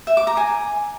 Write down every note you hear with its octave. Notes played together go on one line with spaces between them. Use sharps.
E5
D6
A#5
G#5